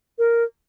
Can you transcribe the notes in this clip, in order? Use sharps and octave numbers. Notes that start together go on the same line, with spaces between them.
A#4